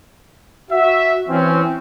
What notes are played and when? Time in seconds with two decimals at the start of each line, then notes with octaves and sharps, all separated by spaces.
0.71 F#4 E5
1.29 E3 C4 C#4